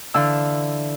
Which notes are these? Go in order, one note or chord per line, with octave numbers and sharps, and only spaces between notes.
D3 E3 E4 F5 A5 E6